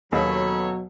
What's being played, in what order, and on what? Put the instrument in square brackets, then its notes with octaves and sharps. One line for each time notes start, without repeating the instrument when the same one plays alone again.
[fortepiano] D#2 [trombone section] B2 F#3 [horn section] C#4 A4 C#5 [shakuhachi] B5